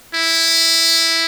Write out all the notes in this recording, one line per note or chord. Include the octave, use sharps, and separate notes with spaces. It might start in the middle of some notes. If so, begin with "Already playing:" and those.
E4